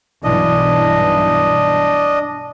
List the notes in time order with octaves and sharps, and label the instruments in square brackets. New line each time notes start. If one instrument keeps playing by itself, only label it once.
[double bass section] B1 G2 E3 [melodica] D4 D#5